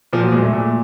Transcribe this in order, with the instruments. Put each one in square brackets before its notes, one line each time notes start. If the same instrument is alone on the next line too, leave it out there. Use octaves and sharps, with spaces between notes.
[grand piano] A#2 F3
F#3
A#2 G#3
A3
A#2